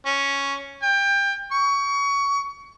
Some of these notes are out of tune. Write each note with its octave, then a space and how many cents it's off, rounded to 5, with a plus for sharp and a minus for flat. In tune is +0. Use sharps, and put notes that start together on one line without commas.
C#4 +0
G5 +25
C#6 +25